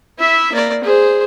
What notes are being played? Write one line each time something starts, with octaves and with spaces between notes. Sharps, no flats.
E4 E5
A#3 D5
G#4 C5